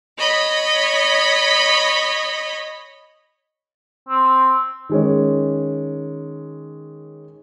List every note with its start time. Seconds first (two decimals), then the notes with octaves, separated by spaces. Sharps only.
0.18 C#5 D#5 B5
4.09 C4
4.89 D#3 G#3 C#4